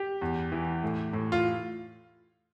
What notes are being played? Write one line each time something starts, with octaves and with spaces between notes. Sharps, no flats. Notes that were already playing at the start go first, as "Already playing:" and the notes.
Already playing: G4
E2
E3
A2
A2
F4